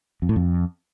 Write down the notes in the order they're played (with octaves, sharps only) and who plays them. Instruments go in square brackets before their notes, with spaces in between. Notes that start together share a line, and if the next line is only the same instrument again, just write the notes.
[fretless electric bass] F2
A2
F2